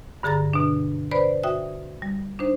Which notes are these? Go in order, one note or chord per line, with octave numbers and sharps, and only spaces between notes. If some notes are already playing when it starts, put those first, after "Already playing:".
G2 D3 G#4 A#5 A6 A#6
B2 D4
B4 C5 D5 B5
F#4 E5 G5 D#6
G3
D4 D#4 C5